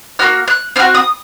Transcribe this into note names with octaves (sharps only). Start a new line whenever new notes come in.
A#3 C#4 F#4 F6
F#6
C4 F#4 F6
D#6